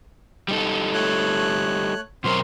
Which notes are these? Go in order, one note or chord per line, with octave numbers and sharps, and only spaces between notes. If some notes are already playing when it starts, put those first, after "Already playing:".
G3 D#4 A4
A3 C#5 F#6
B2 F#3 C4 A#4 C6 F6